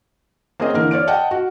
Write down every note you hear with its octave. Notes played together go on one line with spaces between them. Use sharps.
A#3 C4 C#4 G#4 D#5
D3 E3 A#3 A#4
C#5 D5 F6 D7
D#5 F#5 G5 A5
F#4